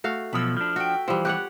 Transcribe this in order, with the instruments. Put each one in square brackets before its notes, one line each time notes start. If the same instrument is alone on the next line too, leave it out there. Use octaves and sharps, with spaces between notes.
[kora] A3 F#4 F5
[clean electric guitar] B1 B2 F3 [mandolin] B5 E6
[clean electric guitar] F3 D4
[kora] F#4 [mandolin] E5 G5
[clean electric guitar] E3 [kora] F3 G3
[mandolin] B3 F#6 [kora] G4 C#5 F#5